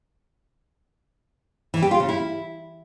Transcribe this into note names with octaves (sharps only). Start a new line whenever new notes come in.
E3
G4
F4
C#3
E4